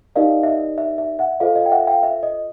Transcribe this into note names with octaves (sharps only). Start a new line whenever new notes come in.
D#4 G4 A#4 D5 D#5 F5
E5
D#5
E5
E5
E5 F#5
F4 A4 C5 D#5 F5
D#5 F5
G5
E5 F#5
F5 G5
E5
D#5